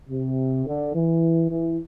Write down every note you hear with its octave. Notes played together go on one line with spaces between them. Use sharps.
C3
D3
E3
E3